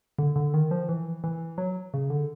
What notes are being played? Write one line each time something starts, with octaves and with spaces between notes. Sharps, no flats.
D3
D3
D#3
F3
E3
E3
F#3
C#3
D3